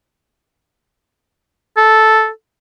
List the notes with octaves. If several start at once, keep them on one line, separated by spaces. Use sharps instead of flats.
A4